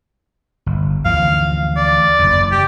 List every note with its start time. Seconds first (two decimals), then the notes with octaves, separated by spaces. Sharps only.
0.66 G1
1.05 D2 E3 F3 F5
1.77 D5
2.19 F#1 E2
2.52 G4